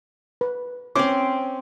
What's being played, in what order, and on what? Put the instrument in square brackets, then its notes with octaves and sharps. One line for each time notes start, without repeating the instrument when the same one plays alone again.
[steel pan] B4
[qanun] C4 C5 [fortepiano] C#4 [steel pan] D6